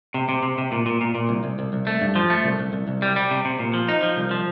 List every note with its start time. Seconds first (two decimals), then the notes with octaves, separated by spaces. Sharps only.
0.14 C3
0.29 C3
0.43 C3
0.58 C3
0.72 A#2
0.86 A#2
1.01 A#2
1.15 A#2
1.29 C2
1.44 C2
1.59 C2
1.73 C2
1.87 A3
2.01 G2
2.16 F3
2.30 A3
2.44 C2
2.59 C2
2.73 C2
2.88 C2
3.02 G3
3.16 G3
3.31 C3
3.45 C3
3.59 A#2
3.74 F3
3.89 D#4
4.03 F3
4.17 C2
4.31 F3